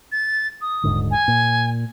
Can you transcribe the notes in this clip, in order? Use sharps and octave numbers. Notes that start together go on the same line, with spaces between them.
A6
D#6
D#1 G#2 D3
G#5
A#2